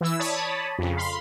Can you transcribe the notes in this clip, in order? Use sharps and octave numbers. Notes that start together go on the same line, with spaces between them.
E3 E4 E6
C#5 D5 A5 B5 D#6
F2 C#3
F5 B5 C6